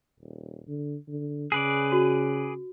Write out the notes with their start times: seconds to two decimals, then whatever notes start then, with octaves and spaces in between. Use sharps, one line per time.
0.20 D#1
0.68 D3
1.08 D3
1.52 C#3 G#4 B4 D5
1.92 F#4